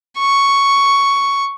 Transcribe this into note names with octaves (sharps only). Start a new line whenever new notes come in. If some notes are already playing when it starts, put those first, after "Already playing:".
C#6